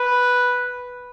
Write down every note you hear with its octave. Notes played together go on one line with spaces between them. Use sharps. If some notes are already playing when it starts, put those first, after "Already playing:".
Already playing: B4